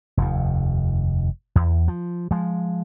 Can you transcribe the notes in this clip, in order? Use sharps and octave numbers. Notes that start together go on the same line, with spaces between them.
F1 D#2
E2
F3
F3 G#3